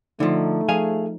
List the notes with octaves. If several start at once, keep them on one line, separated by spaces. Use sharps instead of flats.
D3 F3 A3 D#4
F3 G#4 F5 G#5